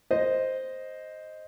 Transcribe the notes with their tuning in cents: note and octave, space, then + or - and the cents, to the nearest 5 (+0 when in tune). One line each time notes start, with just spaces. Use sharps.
C5 +0 D#5 +0